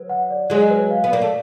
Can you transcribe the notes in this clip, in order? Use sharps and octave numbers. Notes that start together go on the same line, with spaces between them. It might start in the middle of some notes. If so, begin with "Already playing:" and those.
Already playing: F#3 B4
F#5
D5
F#3 G#3 G#4
B4
F5
B3
A#3 D5
A3